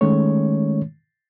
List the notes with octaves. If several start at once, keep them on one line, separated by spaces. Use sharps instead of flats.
D#3 G#3 A3 C#4 C#5